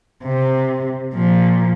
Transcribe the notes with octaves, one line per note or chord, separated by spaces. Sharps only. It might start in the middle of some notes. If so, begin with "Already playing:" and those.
C3
A#2 F3